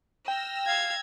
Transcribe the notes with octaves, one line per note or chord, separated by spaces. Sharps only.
G5 E6 F6 A#6
F5 G#6